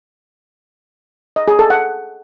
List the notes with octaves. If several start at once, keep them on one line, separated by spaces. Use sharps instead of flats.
D#5
G#4
A4
F#5